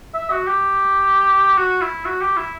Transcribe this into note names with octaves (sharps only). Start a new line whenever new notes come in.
E5
F#4
G4
F#4
E4
F#4
G4
E4